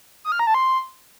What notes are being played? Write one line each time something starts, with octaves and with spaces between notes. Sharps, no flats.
D#6
F6
A#5
A5
C6